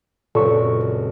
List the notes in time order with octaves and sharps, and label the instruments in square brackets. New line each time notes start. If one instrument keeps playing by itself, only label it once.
[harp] C#2 F#2 C4 [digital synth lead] A#2 [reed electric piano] A4 C#6